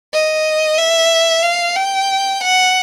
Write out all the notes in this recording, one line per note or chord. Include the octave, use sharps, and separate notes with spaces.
D#5
E5
F5
G5
F#5